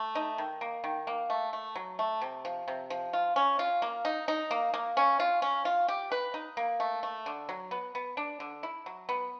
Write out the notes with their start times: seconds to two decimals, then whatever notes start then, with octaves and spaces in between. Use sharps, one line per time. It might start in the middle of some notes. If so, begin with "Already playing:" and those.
Already playing: A3
0.15 D#4
0.38 D#3
0.61 A#3
0.84 D#3
1.07 A#3
1.30 A3
1.53 A3
1.76 F#3
1.99 A3
2.21 C3
2.45 F3
2.68 C3
2.90 F3
3.13 F4
3.36 C#4
3.59 F4
3.82 A#3
4.05 D#4
4.28 D#4
4.51 A#3
4.74 A#3
4.97 C#4
5.20 F4
5.42 C#4
5.65 F4
5.88 G4
6.12 B4
6.34 D#4
6.57 A#3
6.80 A3
7.03 A3
7.26 D3
7.49 F#3
7.71 B3
7.95 B3
8.17 D4
8.40 D3
8.63 E4
8.86 F#3
9.09 B3